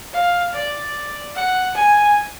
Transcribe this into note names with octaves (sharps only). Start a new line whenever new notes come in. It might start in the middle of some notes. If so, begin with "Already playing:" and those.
F5
D5
F#5
G#5